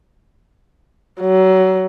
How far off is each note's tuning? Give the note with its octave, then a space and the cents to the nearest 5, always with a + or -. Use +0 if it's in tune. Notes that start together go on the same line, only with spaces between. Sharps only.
F#3 +25